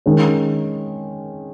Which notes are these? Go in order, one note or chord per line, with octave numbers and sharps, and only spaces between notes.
D#3 G#3 C#4